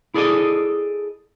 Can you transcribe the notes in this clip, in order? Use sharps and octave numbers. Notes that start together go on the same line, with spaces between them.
E4 G#4 A4 D5 D#5